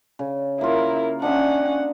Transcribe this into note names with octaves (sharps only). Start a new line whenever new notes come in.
C#3
A#3 E4 F4 A#4
C#4 D4 D#5 E5 F#5